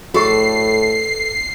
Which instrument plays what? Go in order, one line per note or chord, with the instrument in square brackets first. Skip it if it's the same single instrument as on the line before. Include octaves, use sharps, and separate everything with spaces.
[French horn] A2 [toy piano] F#4 G#4 C#6 [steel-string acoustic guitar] A4 B4 D5 [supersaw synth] C7